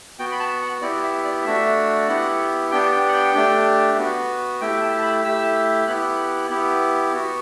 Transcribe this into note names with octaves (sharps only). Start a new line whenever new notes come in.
B3 F#4 G5
B5
A5
F#5
B3 E4 G4 D5
E5
D5
A3 D4 F#4 E5
B3 E4 G4 F#5
B3 D4 G4 G5
G5
F#5
G5
A3 D4 G4
B3 F#4
A3 E4 G4 G5
G5
A5
A5
B5
A3 E4 G4 E6
B3 E4 G4 F#6
B3 E4 G4
B3 F#4